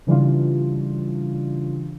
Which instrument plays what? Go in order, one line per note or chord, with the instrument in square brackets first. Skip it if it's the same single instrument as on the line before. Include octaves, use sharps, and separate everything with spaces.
[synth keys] C#3 E3 G3 D4 F4